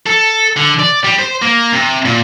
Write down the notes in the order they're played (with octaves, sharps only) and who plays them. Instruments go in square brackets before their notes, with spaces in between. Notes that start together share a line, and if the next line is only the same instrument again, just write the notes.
[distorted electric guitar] A4
D3
D5
G3
C5
A#3
C3
A#2